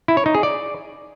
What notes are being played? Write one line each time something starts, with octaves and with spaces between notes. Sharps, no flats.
E4
C#5
D#4
G#4
D5